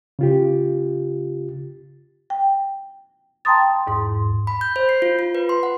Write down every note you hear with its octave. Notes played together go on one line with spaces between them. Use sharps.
C#3 F4 G4
G5
G5 A5 A#5 C6 D#6 A6
E2 G#2 C6
B5
G6
C5
C7
F4
F4
B4
C6
F#5